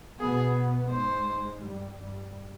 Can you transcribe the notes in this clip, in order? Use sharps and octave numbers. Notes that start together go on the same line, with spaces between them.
B2 B3 G#4
G#2 G#3 C5
G2 G3
G2 G3